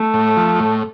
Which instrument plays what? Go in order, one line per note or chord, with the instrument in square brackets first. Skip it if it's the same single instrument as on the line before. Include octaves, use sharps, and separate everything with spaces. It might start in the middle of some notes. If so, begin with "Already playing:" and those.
Already playing: [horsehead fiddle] A3
[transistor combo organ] A2
F3
A2